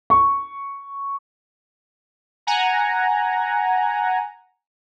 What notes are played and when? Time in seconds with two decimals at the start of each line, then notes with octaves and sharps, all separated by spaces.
0.10 C#6
2.47 F#5 G#5 A#5